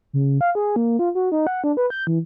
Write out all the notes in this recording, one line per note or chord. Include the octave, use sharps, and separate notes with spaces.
C#3
F5
G#4
A#3
F4
F#4
D#4
F#5
D4
B4
G6
E3